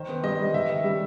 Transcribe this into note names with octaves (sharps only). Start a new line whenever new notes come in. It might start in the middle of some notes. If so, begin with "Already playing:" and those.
Already playing: D#3 C5
B3
G3 D#5
G3
D#3 E5
D#3
G3